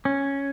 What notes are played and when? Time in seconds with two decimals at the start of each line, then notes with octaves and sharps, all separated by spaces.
0.05 C#4